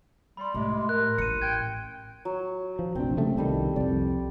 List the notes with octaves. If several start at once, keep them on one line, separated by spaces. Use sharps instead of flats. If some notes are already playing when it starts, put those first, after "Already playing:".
G3 B5 C6
A2 C3 G#3
A#4 F#6
A1 C#7 D#7
G5 F#6 G#6
F#3
F3
F1 A#1 C4 D4
C#3 G3 A3
C2 D#3 G3 A4
C2 F2 D5